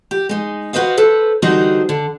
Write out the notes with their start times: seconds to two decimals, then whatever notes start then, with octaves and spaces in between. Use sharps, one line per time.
0.11 G4
0.29 G#3 D#4
0.73 F#4 B4 C5 D#5 F5
0.97 A4 B4 C5
1.42 D3 E3 G3 D#4 F#4 C5
1.89 D3